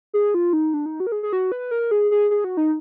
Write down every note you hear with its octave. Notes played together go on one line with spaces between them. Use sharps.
G#4
F4
D#4
D4
D#4
F#4
A#4
G#4
G#4
F#4
B4
A#4
G#4
G#4
G#4
F#4
D#4